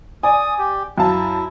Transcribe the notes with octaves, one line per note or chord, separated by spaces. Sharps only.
D5 G#5 D#6
G4
F#2 E4 F5 A5